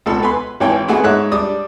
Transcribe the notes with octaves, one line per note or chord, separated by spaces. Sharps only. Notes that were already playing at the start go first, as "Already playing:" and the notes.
C#2 B2 A4
B4 G#5 B5 C6
G#1 E3 C#5 G5 G#5
G#3 A3 B3 F#4 G#4 G#5
G#2 G#3 C#5 E5 F#6
G3 D4 D5 D#6